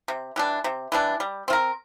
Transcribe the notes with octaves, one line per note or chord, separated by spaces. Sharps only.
C3
E3 G3 D4
C3
E3 G3 D4
G3
C4 F4 A#4